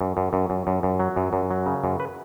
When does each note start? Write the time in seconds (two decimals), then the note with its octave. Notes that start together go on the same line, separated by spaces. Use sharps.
0.01 F#2
0.17 F#2
0.33 F#2
0.50 F#2
0.67 F#2
0.83 F#2
1.00 F#3
1.16 F#2
1.33 F#2
1.51 F#3
1.66 C#3
1.84 F#2
2.00 B4